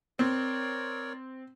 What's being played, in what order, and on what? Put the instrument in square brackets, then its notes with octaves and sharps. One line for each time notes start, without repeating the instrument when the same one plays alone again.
[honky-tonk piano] C4 [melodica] A#4 C#5 D5